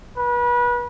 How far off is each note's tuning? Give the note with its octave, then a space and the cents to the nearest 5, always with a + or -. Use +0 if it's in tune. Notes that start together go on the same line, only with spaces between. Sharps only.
B4 -30